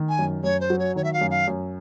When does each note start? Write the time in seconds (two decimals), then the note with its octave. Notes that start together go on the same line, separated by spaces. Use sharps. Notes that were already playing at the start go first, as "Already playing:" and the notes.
Already playing: D#3
0.09 G#5
0.19 F#2
0.44 F#2 C#5
0.61 C5
0.70 F#3
0.79 C#5
0.95 D#3 C#5
1.04 E5
1.13 F5
1.21 F#2
1.31 F5
1.47 F#2